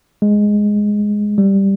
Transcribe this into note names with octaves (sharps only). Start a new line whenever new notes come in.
G#3
G3